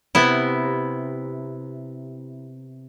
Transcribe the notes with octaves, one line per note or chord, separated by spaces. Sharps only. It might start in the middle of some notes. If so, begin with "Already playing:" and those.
C3 B3 E4